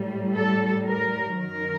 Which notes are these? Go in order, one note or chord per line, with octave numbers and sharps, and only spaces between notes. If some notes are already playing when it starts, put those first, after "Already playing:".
Already playing: A2 G3
A4
A#4
F#2 D#3 F#3 A#4